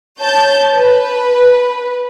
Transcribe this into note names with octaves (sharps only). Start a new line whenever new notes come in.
C#5 A5 G6
B4